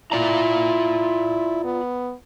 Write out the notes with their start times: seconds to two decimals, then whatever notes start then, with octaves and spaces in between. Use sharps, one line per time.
0.12 E4 F4 D5 A#5
1.64 B3